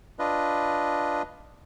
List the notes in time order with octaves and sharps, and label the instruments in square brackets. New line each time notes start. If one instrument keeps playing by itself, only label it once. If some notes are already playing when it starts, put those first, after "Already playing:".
[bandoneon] D4 F4 B4 D#5